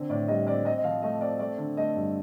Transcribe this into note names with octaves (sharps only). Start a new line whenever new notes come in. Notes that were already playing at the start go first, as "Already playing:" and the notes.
Already playing: D3 C4
A2 D5
G3 D#5
C4 D5
C4 D#5
D#5
F3 F5
A3 D#5
C4 D5
A3 D5
D3
A3 D#5
G2